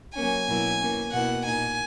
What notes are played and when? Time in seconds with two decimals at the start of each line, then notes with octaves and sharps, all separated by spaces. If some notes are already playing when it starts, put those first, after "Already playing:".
0.15 F#3 A#3 C#4 G#5
0.47 B2 F#3 A#3 E4
0.80 E3 A#3 C#4
1.12 B2 A#3 E4 F#5
1.45 A#2 A#3 D#4 G#5